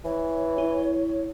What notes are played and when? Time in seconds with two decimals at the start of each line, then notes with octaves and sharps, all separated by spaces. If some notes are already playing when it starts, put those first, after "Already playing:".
0.05 E3 C#5
0.58 E4